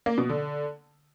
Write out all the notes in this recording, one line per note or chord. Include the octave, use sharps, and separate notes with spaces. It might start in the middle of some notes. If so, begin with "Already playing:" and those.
A#3
B2
D3